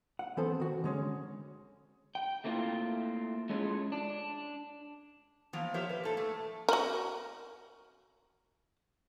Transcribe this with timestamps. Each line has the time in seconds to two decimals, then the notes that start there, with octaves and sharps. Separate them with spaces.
0.19 F#5
0.37 E3 B3 C4 A4 C5
0.60 D#3 F#4
0.84 D3 G#3 C#4
2.15 G5
2.44 A3 A#3 C4 E4 F4
3.50 G#3 A3 C#4 E4 F4 G#4
3.92 D4
5.53 E3 F3 A#3 B3
5.74 F4 G4 A#4 C5 C#5 E5
5.89 A#2 B4
6.04 A#2 A4
6.17 A#2 A3
6.69 F#4 A#4